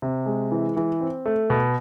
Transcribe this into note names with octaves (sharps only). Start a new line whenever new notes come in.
C3
G#3
E3
E3
C4
A3
B2